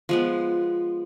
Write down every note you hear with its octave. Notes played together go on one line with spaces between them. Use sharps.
F3 G#3 B3